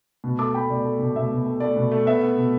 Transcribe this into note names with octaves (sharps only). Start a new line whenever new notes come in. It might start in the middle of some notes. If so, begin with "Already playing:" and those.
B2
A3 A5 D6
A3 G5 B5
B2 D5
A3
B2
B2 E5
B2
A3
A3 D5
B2
A3
B3 E5
B3
B2